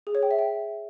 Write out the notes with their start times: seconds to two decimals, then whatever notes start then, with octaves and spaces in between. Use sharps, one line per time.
0.07 G#4
0.15 C#5
0.23 G5
0.31 E5
0.39 G5